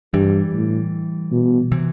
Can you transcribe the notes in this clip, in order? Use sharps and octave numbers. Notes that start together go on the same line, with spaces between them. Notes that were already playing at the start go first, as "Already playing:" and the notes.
G2 E3 G3
A2
B2
C3 E3